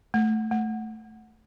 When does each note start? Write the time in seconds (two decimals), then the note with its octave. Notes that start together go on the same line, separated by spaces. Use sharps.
0.14 A3
0.51 A3